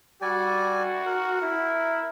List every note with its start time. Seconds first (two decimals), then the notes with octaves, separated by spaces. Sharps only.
0.22 G3 F#4 D5 G#5
1.06 A#4
1.42 E4